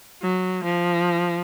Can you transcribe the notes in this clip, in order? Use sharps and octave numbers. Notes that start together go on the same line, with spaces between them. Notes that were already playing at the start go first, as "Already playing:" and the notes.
F#3
F3